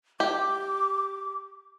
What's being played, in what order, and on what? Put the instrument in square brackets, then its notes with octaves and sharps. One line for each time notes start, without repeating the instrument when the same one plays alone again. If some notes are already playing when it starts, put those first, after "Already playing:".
[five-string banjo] G4 [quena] D6